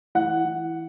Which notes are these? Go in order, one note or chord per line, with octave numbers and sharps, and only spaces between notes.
E3 F#5
E3